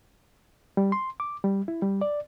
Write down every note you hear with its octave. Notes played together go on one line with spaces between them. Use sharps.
G3
C6
D6
G3
E4
G3
D5